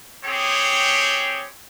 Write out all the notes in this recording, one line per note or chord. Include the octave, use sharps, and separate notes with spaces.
C4 G4 G#4 C#5